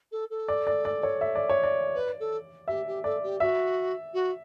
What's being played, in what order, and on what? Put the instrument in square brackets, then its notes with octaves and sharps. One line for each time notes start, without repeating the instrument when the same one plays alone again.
[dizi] A4
A4
[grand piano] D5
D5
D5
C#5
E5
D5
C#5
D5
[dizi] B4
A4
[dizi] G4 [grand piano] E5
[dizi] G4
[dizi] A4 [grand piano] D5
[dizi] G4
[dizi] F#4 [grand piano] E5
[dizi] F#4